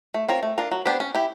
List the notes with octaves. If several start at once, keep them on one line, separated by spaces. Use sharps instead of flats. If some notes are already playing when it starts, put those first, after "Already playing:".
A3
C4 F4 A#4 C#5
A3
D4 F4 A#4
F#3
B3 D4 G4 C5
C#4
E4 G4